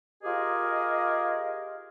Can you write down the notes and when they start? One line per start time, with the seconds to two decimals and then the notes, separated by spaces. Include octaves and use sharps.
0.24 F4 G4 G#4 A#4 D#5